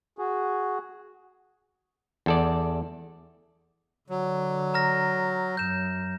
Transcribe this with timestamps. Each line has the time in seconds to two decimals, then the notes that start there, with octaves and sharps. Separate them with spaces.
0.18 F#4 G#4
2.26 E2 A4 D5
4.10 D3 F#3
4.74 A#5 F6 A#6
5.57 F#2 G6 E7